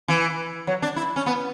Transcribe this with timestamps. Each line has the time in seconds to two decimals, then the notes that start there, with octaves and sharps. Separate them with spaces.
0.08 E3
0.67 F#3
0.82 D4
0.96 E4
1.16 C#4
1.26 B3